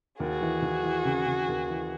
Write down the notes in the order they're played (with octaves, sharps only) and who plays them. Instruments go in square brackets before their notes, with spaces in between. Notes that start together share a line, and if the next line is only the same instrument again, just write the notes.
[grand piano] D#2 [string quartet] F#4 G#4
[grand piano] E3
D#2
E3
C#3
C#3
D#2
E3